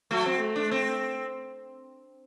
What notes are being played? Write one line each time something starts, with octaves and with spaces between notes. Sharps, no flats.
F#3 A3
C4
A3
D4
C4